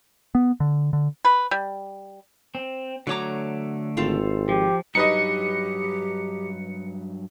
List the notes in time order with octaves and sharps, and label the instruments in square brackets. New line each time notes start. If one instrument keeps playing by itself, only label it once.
[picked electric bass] B3
D3
D3
[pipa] B4
G3
[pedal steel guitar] C4
[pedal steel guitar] D3 A3 D6 [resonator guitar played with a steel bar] F#3 C#5 A#5
[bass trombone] G#1 [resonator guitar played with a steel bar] C4 F4 A4
[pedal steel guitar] F3 [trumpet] G4
[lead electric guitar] G2 F#3 [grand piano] D#4 B4 D#5 [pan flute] G4 [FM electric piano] C#7